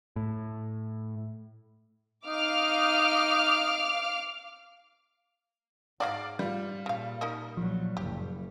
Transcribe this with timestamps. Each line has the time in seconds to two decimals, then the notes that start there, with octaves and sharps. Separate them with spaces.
0.16 A2
2.27 D#4 F5 D6 F6
6.00 G#2 G#3 D#4 F#4 D5 F5
6.39 G3 F4
6.86 A#2 C#3 F5
7.21 D#4 A#4 D#5
7.57 A#1 F3 F#3
7.97 F#1 G4